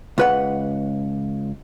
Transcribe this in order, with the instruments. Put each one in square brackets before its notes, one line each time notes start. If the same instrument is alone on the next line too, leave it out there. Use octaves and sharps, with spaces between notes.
[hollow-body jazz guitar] C#2 B4 F#5